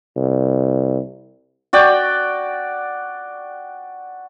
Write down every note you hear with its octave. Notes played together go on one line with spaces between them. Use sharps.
C2
F#4 D5 G5